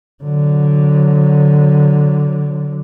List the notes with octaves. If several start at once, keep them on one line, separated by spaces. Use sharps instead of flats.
D3 F#3